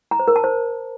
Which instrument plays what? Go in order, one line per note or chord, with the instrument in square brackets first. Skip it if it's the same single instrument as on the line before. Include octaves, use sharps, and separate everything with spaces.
[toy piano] A#5
C5
A#4
A5
C5